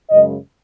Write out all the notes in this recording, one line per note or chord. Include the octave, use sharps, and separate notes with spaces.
F#2 C#3 G#3 D#5